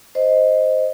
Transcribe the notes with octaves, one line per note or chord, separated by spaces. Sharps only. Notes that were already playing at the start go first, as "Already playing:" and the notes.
C5 D#5